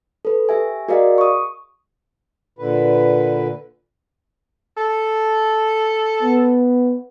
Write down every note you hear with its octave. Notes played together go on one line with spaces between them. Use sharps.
A4 B4
G4 E5 G#5
F#4 G#4 A#4 D5 D#5 F5
C#6 D#6
A#2 D3 B4
A4
B3